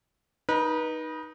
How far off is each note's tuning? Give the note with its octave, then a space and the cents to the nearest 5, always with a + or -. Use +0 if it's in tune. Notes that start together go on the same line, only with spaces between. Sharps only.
D#4 +0 B4 -30